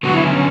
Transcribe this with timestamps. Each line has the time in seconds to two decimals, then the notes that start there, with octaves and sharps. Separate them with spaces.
0.03 D3 F#3 B3 F#4
0.13 E4
0.23 C#4